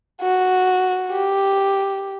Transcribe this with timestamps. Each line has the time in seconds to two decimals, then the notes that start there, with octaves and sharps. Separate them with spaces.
0.21 F#4
1.12 G4